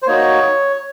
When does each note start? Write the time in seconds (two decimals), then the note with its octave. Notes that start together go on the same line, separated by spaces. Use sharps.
0.03 C5
0.07 A#3 D#4 F#4 C#5